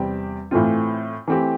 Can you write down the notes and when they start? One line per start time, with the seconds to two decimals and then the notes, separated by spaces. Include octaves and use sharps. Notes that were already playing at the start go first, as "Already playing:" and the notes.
Already playing: E2 C3 G3 C4 G4
0.51 A2 E3 A3 C4 F4
1.28 E3 A3 C4 G4